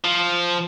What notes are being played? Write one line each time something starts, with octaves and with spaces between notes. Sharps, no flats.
F3